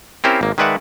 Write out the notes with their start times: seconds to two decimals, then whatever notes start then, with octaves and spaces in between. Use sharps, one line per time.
0.24 C4 C#4 E4 G4 A#4 C5
0.41 G#1 A#3
0.58 D#3 G#3 B4 D5 E5 F#5